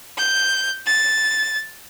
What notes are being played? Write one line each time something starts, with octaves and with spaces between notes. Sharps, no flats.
G6
A6